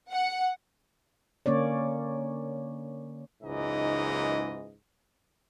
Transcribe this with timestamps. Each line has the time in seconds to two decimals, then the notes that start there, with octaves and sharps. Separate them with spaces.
0.11 F#5
1.46 D3 A#3 C#4 C#5 D5
3.43 F#1 C#2 G#2 E3 D#4 D#5